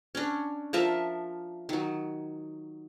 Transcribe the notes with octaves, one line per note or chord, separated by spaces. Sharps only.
C#4 D4
F3 A#4 E5 A5
D#3 F#3